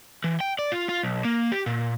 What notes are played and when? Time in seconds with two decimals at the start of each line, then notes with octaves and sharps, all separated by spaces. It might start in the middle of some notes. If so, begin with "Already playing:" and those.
0.24 E3
0.40 G5
0.59 D5
0.72 F4
0.89 F4
1.03 B1
1.25 A#3
1.52 G4
1.66 A#2